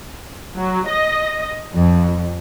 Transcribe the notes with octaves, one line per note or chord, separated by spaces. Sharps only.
F#3
D#5
F2